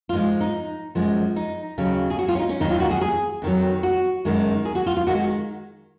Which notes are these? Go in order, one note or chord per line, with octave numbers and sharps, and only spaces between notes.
F4
G#2 F3 G#3 D#4
D#4
F#2 F3 G#3
D#4
D#2 C#3 F#3
G#4
F#4
F4
C#4
D#4
C#4
D#2 D#3 F#3 D#4
F4
F#4
G#4
G#4
F2 D#3 F#3
F#4
F#2 D#3 G#3
G#4
F#4
F4
F4
D#3 G#3 F#4